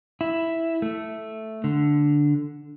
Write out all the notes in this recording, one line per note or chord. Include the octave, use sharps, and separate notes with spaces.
E4
A3
D3